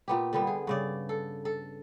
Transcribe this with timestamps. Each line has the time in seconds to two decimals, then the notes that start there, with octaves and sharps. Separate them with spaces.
0.08 A#2 B3 G4
0.33 D3 G3 B3
0.47 G#4
0.67 G2 C#3 D5
1.09 A4
1.45 A4